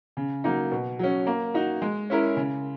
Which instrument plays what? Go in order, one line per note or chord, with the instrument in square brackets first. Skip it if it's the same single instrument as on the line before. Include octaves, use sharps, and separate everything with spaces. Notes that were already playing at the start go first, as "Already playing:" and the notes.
[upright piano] C#3
F#3 A#3 D#4
B2
F#3 C#4
A#3
D#4 F#4
G#3
C#4 E4 A#4
C#3